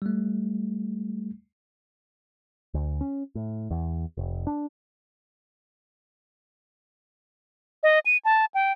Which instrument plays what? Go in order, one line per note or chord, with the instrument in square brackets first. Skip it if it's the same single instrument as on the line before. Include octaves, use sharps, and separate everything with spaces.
[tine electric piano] G3 A3
[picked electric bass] D2
C#4
A2
E2
F1
D4
[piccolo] D#5
D#7
A5
G5